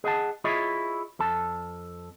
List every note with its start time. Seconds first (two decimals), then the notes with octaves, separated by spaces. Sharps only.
0.04 G#4 D#5 F#5 A5
0.44 E4 F4 G#4 C#5 D#5 E5
1.19 F2 A4 A5